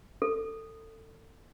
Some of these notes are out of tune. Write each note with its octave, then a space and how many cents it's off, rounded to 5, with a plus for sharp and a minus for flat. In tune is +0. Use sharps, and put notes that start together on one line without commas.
A4 +25